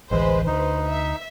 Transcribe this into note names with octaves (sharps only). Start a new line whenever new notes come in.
A1 D2 E3 G#3 B4 C5
D2 D#4 B4 C5
E5